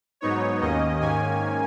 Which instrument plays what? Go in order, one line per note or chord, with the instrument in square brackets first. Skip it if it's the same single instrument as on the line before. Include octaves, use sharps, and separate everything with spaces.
[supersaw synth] G#2 F#3 B3 D#4 C#5
D#2 D#3 A#3 C#4 D#5
G#2 D#3 A#3 C#4 G#5